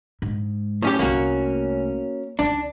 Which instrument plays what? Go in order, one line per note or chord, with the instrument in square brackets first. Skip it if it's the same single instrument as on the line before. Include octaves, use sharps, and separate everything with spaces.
[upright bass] G#2
[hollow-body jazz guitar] A2 C#4 G4
[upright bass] C2 A3 [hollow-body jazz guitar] A#3 C#4 F#4
[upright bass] C#2 D#4 [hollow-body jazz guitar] D4